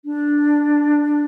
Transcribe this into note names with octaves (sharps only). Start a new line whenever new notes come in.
D4